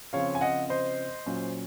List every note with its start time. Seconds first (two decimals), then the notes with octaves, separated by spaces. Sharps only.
0.13 C#3 F3 C4 C#5 F5
0.35 G#5
0.41 D#5 F#5
0.69 C5 D#5
1.26 A#2 F#3 C#4